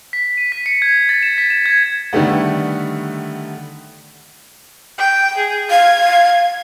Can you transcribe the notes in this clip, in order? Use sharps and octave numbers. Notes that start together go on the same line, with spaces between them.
B6
D#7
B6
C#7
G#6
A6
E7
B6
E7
G#6
D3 D#3 G3 A3 B3
G5
G#4
F5 G#6